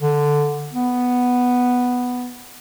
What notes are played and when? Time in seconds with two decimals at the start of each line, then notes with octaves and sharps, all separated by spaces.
0.01 D3
0.73 B3